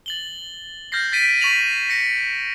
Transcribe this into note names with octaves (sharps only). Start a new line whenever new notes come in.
A6 F#7 G7
F6 G6 A6 A#6 C7
G6 A6 B6 D7 D#7
C#6 A6 B6 D#7 F7 F#7
A#6 C#7